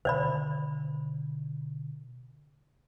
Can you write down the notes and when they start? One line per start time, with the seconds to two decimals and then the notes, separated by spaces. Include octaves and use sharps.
0.05 B2 D3 D#3 C5 D5 B5